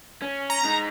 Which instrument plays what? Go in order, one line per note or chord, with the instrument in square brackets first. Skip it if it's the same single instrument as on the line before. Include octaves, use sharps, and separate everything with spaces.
[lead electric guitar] C#4
[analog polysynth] A#5
[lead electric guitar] G#3 D#4